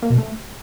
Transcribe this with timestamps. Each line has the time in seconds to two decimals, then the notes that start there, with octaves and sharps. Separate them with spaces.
0.03 A#3
0.10 B2
0.18 A3